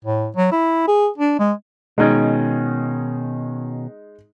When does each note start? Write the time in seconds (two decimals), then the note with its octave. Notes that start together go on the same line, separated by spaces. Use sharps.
0.05 A2
0.37 F#3
0.52 E4
0.88 G#4
1.18 D4
1.39 G#3
1.98 B2 D#3 G#3 C#4 D#4